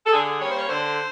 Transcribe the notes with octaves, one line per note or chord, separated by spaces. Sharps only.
A4
D3 G#4
G3 A#3 C#4 C#5
C5
C#5
D3 C5